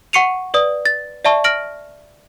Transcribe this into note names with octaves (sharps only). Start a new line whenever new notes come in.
F#5 C#6 C7 C#7 D#7 F7
B4 D5 D#6
A6
D5 E5 A5 C#6
F6 A#6 D7 F#7